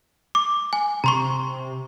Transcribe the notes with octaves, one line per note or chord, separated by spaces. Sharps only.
D6
G#5
C3 A#5 C6 C#6